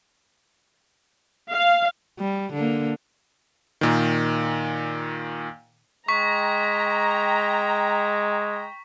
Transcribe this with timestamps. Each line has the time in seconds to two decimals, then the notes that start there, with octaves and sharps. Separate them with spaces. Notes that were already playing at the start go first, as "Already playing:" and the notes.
1.51 F5
2.19 G3
2.53 D3 A#3
3.81 A#2 D#3
6.08 G#3 G5 A#5 C#6 B6